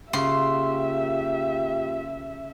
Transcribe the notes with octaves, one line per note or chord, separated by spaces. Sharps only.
C#3 A#3 F4 G4 E5 C6